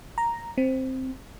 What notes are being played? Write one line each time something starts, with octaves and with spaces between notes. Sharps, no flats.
A#5
C4